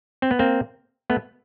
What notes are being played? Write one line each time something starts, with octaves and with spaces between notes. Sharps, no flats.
C4
B3
A#3 C4
A3 B3